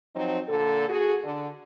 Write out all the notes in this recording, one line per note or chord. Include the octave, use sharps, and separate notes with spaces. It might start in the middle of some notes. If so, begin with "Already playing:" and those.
F3 F#3 C4 D#4
A#2 D3 A4
F#4 G#4
D3